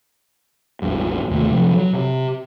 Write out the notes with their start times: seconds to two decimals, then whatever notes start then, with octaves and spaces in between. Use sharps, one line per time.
0.82 A1 E2 G2
1.30 D#2 C3 A3
1.50 C3 F3 F#3
1.72 F#3
1.93 C3